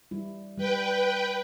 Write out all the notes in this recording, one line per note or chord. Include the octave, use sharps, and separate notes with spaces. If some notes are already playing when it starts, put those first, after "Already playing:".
G3 E4
G3 B4 G5